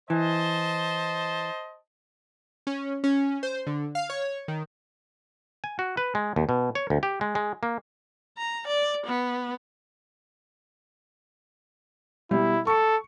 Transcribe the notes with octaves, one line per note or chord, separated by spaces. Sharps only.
E3 C5 D#5 A5
C#4
C#4
C5
D3
F5
C#5
D#3
G#5
F#4
B4
G#3
D#2
B2
C#5
D2
G4
G#3
G#3
A#3
A#5
D5
B3
B2 G3 E4
A4 C#6 C#7